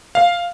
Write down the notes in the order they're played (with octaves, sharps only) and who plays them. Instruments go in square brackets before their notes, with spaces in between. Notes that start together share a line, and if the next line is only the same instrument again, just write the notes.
[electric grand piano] F5